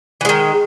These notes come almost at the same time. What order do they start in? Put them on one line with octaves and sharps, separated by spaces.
E3 G#3 D#3